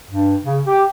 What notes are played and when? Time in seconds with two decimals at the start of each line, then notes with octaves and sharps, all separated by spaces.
0.09 G2
0.44 C#3
0.67 G4